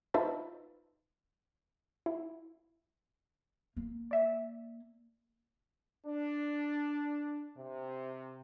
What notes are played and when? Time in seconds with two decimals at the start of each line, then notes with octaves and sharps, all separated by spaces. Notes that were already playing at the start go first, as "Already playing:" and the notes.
0.14 D#4 F4 B4 C5 E5 A5
2.06 E4
3.77 A#3
4.11 D5 E5
6.06 D4
7.57 C3